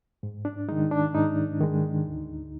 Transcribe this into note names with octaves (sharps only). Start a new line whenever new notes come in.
G#2
D4
D#3 G#3 D#4
D4
G#2 D#4
D#3 G#3
D2